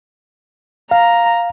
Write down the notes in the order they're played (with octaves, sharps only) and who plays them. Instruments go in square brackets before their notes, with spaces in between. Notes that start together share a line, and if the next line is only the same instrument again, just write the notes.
[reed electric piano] F5 [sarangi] A#5